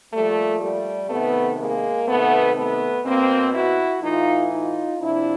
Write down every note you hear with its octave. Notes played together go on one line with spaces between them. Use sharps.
A#2 F3 G3 A3
G3 A3
C3 D#3 A3 B3
G#3 A#3
C3 D#3 A3 B3
A3 B3
B2 A#3 C4
E4 F#4
A2 E3 D#4 F4
D#4 F4
C3 F3 D4 E4